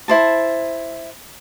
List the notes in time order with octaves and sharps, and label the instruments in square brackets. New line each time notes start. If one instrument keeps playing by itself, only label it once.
[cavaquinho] E4 C5 A5